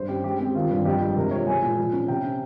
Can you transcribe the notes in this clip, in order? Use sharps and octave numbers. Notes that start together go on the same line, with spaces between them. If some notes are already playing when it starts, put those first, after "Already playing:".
Already playing: G2 C5
C#4 G4
G#3 G4
C4 G4
D#3 F4
G2
F2 G4
G#3
C3 A#4
F3 C#5
G#3 G#5
A#2
F3
C#4
C3 G5
C#4